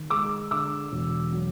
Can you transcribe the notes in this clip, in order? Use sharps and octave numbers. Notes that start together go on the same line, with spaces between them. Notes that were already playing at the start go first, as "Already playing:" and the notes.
Already playing: D#3
G#3 D6 E6
D3 D6 E6
E1
F#3